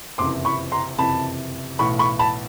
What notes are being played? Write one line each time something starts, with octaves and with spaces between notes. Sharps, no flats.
F#1 F2 C3 E3 C6 D6
B5 C#6
A#5 C6
F#1 F2 C3 E3 A5 B5
B1 A2 E3 B5 C#6
B5 C#6
A5 B5